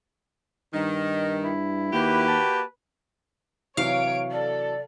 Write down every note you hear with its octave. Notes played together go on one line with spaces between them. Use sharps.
G2 D#3 D#5
E4
D#2 A#3 F#4 G4 B4
A5
C3 E3 F#3 C#5 F5 D7
A4 D5